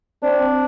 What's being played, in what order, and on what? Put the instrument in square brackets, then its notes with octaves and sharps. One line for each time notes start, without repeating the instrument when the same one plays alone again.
[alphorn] C4 [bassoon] D4